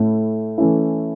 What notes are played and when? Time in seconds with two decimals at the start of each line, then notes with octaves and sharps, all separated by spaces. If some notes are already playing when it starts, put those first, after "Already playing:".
Already playing: A2 A3 E4
0.58 E3 A3 C#4 E4